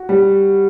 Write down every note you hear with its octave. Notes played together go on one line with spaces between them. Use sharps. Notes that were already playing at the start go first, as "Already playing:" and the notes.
Already playing: F#4
G3